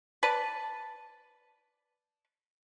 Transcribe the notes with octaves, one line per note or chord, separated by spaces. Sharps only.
B4 D5 A5